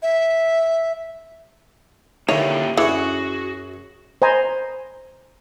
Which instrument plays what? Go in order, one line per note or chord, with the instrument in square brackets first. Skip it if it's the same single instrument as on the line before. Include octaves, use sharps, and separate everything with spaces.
[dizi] E5
[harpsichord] D3 D#3 [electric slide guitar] A#3 F4 G4 [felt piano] E4 D#7 [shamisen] C#5
[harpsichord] F#2 C#4 [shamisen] D3 E3 [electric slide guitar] F#4 [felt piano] G#4
[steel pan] C5 D#5 G#5 A#5 B5